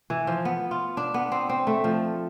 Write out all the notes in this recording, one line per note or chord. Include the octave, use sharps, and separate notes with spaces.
E3
F3
B3
F4
D4
B3
C4
C4
A3
F3